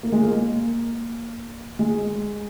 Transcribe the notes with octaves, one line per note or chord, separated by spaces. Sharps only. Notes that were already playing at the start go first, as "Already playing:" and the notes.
A#3
G#3
A#3
G#3